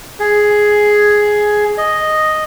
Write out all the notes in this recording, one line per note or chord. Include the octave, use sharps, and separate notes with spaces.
G#4
D#5